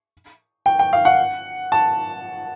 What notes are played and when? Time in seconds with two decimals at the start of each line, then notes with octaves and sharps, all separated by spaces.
0.66 G5
0.79 G5
0.93 F5
1.05 F#5
1.72 A5